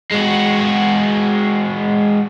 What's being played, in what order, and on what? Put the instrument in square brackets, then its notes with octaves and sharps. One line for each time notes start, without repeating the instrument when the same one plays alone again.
[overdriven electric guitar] G#3 F#4